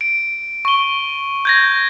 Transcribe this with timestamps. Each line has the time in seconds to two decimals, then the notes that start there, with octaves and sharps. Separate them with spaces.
0.01 D7
0.65 C#6 G7
1.45 G6 G#6 A#6